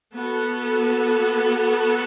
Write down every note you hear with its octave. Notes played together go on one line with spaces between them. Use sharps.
B3 F#4 A4